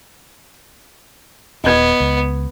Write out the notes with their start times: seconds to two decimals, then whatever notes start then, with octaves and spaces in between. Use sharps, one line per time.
1.64 D#1 B3 D#5 G#6
2.00 C#2